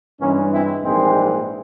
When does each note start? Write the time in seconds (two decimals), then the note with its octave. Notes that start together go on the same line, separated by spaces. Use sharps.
0.20 G2 E3 G#3 A#3 C#4
0.51 C4 E4
0.81 A#1 G#2 E3 G3 G#3 C4